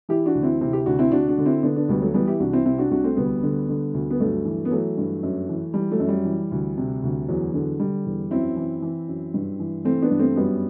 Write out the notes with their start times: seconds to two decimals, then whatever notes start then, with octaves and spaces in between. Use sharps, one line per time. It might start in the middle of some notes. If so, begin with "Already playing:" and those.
0.09 E3 E4 G4
0.26 D4 F#4
0.35 D2
0.43 C4 E4
0.61 C3 C4 E4
0.73 E4 G4
0.86 D2 D4 F#4
0.99 C4 E4
1.12 D2 D4 F#4
1.29 D4 F#4
1.38 D3
1.46 C4 E4
1.63 D3 B3 D4
1.76 B3 D4
1.89 D2 G3 B3
2.01 F#3 A3
2.14 E3 G3 B3
2.27 E4 G4
2.40 C2 D4 F#4
2.53 C4 E4
2.65 C3 C4 E4
2.78 D4 F#4
2.91 C2 D4 F#4
3.04 A3 C4
3.17 D2 G3 B3
3.43 D3
3.69 D3
3.94 D2
4.11 B3
4.20 G2 F#3 A3
4.45 E3
4.65 B3
4.71 E3 F#3 A3
4.98 G2
5.23 F#2
5.49 E3
5.74 E3 G3
5.91 F#3 A3
6.00 F#2
6.08 G3
6.25 E3
6.52 D2
6.77 C3
7.03 D2
7.28 E2 F#3
7.54 D3
7.79 D3 G3
8.06 E2
8.31 F#2 C4 E4
8.57 E3
8.82 E3
9.08 F#2
9.34 G2
9.59 E3
9.84 E3 A3 C4
10.02 B3 D4
10.11 G2
10.19 A3 C4
10.36 F#2 G3 B3